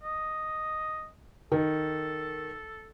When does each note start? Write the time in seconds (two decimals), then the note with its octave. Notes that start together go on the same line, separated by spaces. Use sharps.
0.03 D#5
1.52 D#3 A4